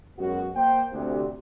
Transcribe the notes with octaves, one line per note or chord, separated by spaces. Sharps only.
F#2 B2 G#3 F#4
A#3 C5 G5
D2 C3